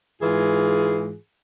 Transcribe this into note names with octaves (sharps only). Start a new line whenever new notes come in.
G#2 E3 F4 G#4